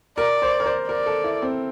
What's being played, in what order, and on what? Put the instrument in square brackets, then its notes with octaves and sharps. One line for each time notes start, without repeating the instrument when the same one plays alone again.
[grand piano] A#4 [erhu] D5
[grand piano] C5
A#4
C5
[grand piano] A#4 [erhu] D5
[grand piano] A4
E4
C4